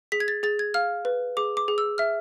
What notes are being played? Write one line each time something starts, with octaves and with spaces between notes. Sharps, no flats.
G#4 B6
G#6
A6
G#4 A6
G#6
F5 F6
B4
G#4 D6
D6
G#4
E6
E5 F6